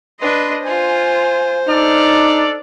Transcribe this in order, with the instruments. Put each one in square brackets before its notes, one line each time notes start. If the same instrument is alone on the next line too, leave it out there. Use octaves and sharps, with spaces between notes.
[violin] D4 C6 [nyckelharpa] B4 D#5
[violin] F4 G#5 [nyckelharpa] C5
[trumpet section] D4 A4 D5 [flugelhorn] D#4 [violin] F6